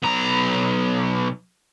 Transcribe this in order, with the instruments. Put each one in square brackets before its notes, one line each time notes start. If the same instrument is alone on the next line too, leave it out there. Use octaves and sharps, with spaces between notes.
[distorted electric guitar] B1 A#5